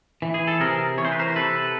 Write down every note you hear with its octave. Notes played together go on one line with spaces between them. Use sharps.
E3
G#4
A4
C3 G#4 A#4
E3 C#5
C5
B4
A#4 C5
C5
C3 A4 B4